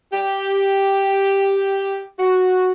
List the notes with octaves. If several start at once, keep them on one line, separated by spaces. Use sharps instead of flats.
G4
F#4